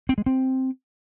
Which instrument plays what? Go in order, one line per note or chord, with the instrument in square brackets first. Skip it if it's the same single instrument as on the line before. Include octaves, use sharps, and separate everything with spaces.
[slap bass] C4
G#3
C4